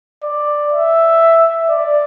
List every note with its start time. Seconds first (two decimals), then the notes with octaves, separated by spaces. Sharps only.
0.23 D5
0.72 E5
1.69 D5